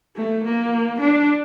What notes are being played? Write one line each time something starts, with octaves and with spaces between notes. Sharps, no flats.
A3
A#3
D4